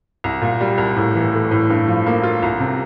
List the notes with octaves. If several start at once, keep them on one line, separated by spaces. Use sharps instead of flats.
C2
A#2
G3
C2
A2
E3
A3
A2
G2
F3
A#3
F4
C2
C3